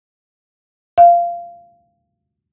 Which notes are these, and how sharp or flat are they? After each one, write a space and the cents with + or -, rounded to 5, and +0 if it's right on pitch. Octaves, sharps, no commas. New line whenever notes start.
F5 -15